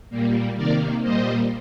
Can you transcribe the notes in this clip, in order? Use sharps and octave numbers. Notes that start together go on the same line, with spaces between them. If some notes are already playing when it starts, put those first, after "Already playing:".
A#2 G3 A#3
C3 D#3 A#3 A#4 D5
A#2 G3 A#3 C5 D#5